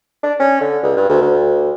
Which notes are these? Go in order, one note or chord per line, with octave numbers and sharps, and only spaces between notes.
D4
C#4
D3
C#2
G2
D2
D2